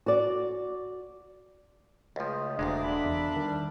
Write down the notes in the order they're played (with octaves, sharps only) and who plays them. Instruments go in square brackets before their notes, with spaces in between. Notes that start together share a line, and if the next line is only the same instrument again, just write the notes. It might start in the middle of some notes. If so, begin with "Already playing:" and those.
[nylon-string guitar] F#4 D5
[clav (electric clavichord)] C#2 F3 [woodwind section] C#3 A3
[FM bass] E1 [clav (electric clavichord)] D2 A#2 G#3 [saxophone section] D4
[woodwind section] E5 B5
[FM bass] E2
[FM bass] D#3 [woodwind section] G3